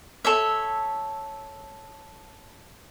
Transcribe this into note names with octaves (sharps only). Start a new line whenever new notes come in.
A4 C#5 E5